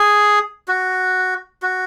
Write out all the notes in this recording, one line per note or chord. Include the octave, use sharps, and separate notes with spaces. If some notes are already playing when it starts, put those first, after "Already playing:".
Already playing: G#4
F#4
F#4